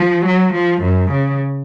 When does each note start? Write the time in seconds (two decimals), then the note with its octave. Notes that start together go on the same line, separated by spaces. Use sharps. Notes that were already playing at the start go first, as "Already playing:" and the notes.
Already playing: F3
0.26 F#3
0.53 F3
0.82 F#2
1.11 C#3